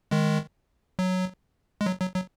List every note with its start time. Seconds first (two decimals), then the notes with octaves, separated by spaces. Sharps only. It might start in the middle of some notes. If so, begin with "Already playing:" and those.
0.11 D#3 G#3
0.99 F#3
1.81 G#3
1.86 F#3
2.00 F#3
2.14 F#3